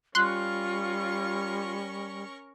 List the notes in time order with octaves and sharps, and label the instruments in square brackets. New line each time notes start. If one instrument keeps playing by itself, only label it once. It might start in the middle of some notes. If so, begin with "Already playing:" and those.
[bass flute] G3 [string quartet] C#4 A#4 C#6 [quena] F4 [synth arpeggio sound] C6 F#6